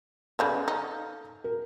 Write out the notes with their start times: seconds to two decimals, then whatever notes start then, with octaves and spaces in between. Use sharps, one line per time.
0.39 C#3 G3 B3 A4 F5 G6
0.68 D#4
1.44 A#4